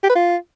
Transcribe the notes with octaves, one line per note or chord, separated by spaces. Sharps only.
G4
B4
F4